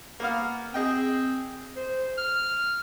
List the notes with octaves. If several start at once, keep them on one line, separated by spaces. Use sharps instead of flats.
A#3 B3 F5
C4 G#4 D#5 G5
C5
F6